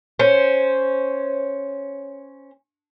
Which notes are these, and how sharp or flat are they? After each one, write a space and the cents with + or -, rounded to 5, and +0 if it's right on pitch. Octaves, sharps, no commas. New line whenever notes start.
C#4 +0 C5 +0